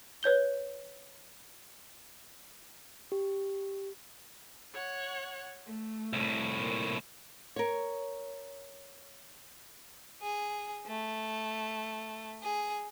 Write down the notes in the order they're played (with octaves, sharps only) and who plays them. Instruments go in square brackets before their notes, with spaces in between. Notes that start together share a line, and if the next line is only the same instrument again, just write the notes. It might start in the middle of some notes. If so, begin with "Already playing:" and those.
[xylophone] B4 C#5 G6 G7
[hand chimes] G4
[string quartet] C#5 F#5 F#6
A3
[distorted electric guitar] C2 A2
[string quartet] A#2
[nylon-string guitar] A#4 C#5
[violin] G#4
A3
G#4